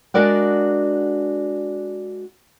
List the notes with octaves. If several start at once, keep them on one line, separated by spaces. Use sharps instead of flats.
G#3 D4 F#4 A#4 D5 F#5